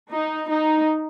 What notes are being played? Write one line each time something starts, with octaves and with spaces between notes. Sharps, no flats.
D#4
D#4